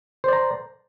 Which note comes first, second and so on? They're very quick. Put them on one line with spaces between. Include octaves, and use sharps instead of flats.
C5 D5 A#5